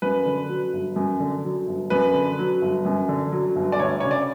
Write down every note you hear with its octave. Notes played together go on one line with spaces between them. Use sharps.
F#2 B4
D3
F#3
G1
F#2
D3
F#3
G1
F#2 B4
D3
F#3
G1
F#2
D3
F#3
G1
D5
D2 C#5
C#3 C#5
D5